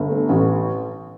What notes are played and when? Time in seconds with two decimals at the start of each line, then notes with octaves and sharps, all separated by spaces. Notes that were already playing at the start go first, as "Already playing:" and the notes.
Already playing: G1
0.09 A3
0.29 A1